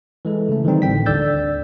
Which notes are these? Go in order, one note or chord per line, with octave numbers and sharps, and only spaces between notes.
E3 G#3 A4
C#3 A3
D#3 E3 G3 C4 D#4
G#1 A2 D3 G5 B6
D2 D3 D5 E6 G6 A6